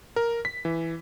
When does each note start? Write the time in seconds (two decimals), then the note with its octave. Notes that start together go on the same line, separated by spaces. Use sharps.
0.16 A#4
0.45 B6
0.65 E3